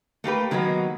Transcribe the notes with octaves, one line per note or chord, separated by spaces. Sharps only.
A3 A#3 G4 B4
D#3 F#3 G#3 A#3 B3